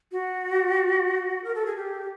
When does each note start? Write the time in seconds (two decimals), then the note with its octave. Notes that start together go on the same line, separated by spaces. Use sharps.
0.12 F#4
1.44 A#4
1.55 A4
1.66 G#4
1.76 G4